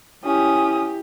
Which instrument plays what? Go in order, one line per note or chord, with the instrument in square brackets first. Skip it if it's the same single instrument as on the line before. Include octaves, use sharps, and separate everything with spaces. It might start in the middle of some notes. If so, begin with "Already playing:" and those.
[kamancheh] C#4 D#6 [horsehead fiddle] E4 G4